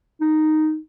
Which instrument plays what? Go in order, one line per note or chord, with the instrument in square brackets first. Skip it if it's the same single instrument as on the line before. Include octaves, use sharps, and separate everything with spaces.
[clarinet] D#4